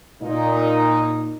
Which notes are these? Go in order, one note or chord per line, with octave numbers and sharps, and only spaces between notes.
A#2 D#4